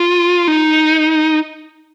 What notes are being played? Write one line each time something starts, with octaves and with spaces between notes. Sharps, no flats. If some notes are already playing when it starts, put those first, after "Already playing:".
Already playing: F4
D#4